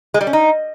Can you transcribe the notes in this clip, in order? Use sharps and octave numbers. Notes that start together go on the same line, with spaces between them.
G#3
G3
C#4
D#4